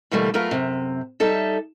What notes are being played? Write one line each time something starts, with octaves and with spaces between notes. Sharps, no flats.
B2 D3 E3 G3 A3 A#3
F#3 A3 B3 F4 A#4
F#2 C3
G3 D#4 A4 E5